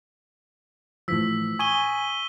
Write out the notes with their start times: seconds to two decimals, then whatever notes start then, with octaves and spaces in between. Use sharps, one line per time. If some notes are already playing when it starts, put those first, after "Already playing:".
1.08 A2 E3 F3 E6 B6
1.59 G#5 C#6 D#6 D#7 G7